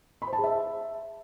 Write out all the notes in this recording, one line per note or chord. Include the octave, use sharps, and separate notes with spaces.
B5
C5
A5
G#4
E5